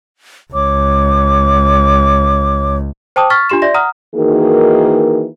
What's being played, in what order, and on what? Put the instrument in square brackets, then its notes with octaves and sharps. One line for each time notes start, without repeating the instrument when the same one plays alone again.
[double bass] C#2 [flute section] C#5 D6
[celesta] C5 G5 A5 D6 D#6
C#6 F6 A6 B6
D4 F4 G4 C6 E7
D5 E5 C6 G6 A#6
F#5 A#5 D#6 F6
[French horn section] D#3 E3 A#3 D#4 F#4 G#4